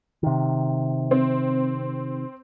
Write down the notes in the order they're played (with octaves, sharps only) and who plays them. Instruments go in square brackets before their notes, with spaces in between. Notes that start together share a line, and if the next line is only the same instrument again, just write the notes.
[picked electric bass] C3 D#3
[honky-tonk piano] C4